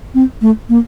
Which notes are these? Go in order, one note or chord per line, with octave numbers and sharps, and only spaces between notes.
C4
A3
A#3